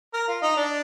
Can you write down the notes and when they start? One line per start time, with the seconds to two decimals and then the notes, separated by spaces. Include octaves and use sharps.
0.14 A#4
0.28 F4
0.42 D#4
0.57 D4